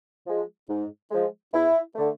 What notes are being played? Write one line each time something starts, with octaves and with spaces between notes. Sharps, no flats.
F3 G#3
G#2
F3 G#3
E2 E4
D3 A3